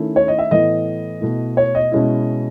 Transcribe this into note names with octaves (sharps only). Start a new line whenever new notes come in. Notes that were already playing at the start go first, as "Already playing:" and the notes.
Already playing: D#3 A3 C#4 E4
C#5
D#5
E5
A2 E3 B3 D#5
B2 A3 E4
C#5
D#5
B2 G#3 C#4 E4